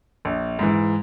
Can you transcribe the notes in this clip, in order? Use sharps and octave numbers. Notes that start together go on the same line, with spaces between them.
A#1
G#2 E3